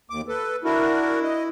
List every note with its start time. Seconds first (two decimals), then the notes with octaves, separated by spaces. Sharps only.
0.10 D#2 D6
0.28 A4 B4
0.64 D4 E4 F#4 A#4
1.23 D#5